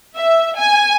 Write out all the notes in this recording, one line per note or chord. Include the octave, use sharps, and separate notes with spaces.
E5
G#5